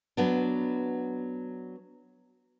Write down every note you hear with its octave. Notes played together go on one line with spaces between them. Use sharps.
F#3 B3 D4